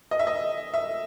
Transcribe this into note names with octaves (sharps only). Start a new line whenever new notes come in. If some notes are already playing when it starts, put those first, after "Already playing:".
D#5
E5
D#5
E5